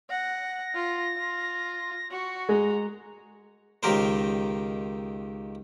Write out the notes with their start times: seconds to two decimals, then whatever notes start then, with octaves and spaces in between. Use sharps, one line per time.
0.10 F#5 A#6
0.75 F4
1.18 F4
2.11 F#4 C#6
2.49 G#3 A#5
3.83 C#2 D#3 G4 A#4 C5